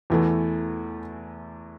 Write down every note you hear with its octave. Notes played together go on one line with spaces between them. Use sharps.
E2 E3 A3